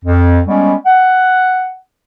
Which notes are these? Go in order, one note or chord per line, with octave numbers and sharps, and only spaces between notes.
F2
G3 G#3 B3 C#4
F#5